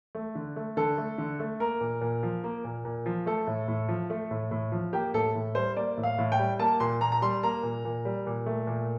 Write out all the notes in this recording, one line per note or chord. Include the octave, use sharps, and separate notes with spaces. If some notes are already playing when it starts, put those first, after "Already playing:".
A3
D3
A3
D3 A4
A3
D3
A3
A#3 A#4
A#2
A#2
F3
A#3
A#2
A#2
F3
A3 A4
A2
A2
F3
A3
A2
A2
F3
A#3 G4
A2 A4
A2
G3 C5
A#3 D5
A2
F5
A2
G5
G3
A#3 A5
A#2 C6
A#2 A#5
A#5
G3 C6
A#3 A#5
A#2
A#2
G3
A#2
A3
A#2